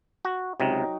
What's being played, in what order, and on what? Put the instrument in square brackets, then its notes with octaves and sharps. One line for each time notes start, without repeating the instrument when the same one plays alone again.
[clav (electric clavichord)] F#4
[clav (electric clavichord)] C#2 C3 [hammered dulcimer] F#3 D#4 G5